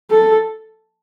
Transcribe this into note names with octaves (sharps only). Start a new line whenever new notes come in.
A4